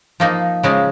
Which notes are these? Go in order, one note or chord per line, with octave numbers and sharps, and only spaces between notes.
F3 A#3 D#4
C#3 F3 G#3